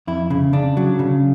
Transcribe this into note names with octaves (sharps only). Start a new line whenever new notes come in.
F2 E4
C#3
C#3 D4
F#3
C#3